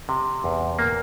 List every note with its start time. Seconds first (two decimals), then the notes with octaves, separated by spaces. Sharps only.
0.09 C3
0.44 E2
0.79 A#3